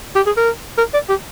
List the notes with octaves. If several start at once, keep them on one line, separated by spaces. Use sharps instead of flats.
G4
G#4
A#4
A#4
D5
G4